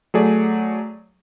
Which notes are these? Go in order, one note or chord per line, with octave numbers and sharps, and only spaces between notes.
F#3 A3 G#4 D5